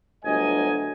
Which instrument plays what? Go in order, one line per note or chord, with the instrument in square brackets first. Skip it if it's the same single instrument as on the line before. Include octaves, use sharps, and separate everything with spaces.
[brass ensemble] G1 D2 F#3 D#5 G#5